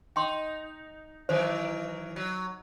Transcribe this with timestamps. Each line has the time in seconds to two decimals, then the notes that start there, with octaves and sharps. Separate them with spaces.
0.16 D#4 G5 C6
1.29 D#3 E3 F#3 C5
2.16 F#3